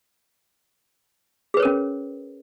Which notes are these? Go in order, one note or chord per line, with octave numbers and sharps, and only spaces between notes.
C#4 G#4 A#4 B4 C#5